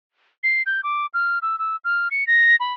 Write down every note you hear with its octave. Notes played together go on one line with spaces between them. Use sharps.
C7
G6
D6
F6
E6
E6
F6
C#7
A#6
B5